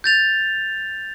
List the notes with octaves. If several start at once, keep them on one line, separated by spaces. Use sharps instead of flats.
G6 A6 F7